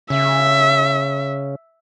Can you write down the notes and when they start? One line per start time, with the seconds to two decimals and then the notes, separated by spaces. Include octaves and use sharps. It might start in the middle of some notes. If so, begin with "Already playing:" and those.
0.10 C#3 E5